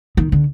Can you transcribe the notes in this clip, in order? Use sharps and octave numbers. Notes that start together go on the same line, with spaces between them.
D#3
D3